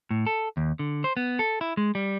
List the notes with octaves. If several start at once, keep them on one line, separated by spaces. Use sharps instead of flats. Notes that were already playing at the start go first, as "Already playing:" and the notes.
A2
A4
D#2
D3
C5
B3
A4
E4
G#3
G3